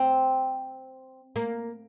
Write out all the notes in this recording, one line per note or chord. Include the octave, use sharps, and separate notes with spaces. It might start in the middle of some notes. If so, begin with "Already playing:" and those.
Already playing: C4
A#3